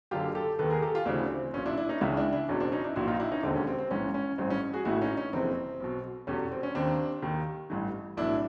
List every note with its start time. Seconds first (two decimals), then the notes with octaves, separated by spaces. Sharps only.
0.11 F#1 F#2 D3 F4 G4
0.35 G4 A4
0.59 D#2 D#3 A4 B4
0.70 G#4 A#4
0.82 G4 A4
0.95 F4 G4
1.06 D2 C#3 E3 C4 D4
1.30 C4
1.53 B1 A#2 C#4
1.66 D4 E4
1.77 D4 E4
1.89 C#4 D#4
2.01 C#2 C#3 E3 D4 E4
2.17 D4 E4
2.32 D4 E4
2.49 F#1 E2 B2 C#4
2.60 C4 D4
2.72 C#4 D#4
2.84 D4 E4
2.96 A#1 A#2 E4 F#4
3.08 D#4 F4
3.19 D4 E4
3.32 C#4 D#4
3.43 E1 D#2 D3 C4 D4
3.55 C#4
3.67 C4
3.78 C4
3.91 A#1 G#2 E3 C#4
4.14 C#4
4.38 A1 G2 E3 C4
4.50 C#4
4.73 F#4 G#4
4.85 A1 A2 E3 E4 F#4
5.01 C#4 D#4
5.17 C#4
5.33 F#1 F2 C3 E3 C4
5.80 B1 B2
6.27 F1 E2 B2 C#4
6.52 C4
6.63 C#4
6.75 D#2 D#3 C4 D4
7.22 D#2 D#3
7.70 A1 G2 E3
8.17 B1 A2 E3 D4 E4